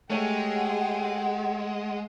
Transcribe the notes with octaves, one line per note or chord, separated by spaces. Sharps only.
G#3 A3 G4 G#4 C#5 F#5 G5